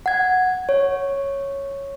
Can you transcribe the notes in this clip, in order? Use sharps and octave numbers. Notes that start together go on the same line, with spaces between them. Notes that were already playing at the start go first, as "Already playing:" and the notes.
F#5 G#6
C#5